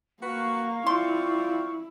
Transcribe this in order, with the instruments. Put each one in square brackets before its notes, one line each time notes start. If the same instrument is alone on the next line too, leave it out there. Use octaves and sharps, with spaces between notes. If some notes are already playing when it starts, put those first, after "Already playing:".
[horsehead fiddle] A#3 [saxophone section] F#4 B4 [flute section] F5 C#6
[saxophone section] C4 F4 D5 [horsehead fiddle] E4 [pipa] C6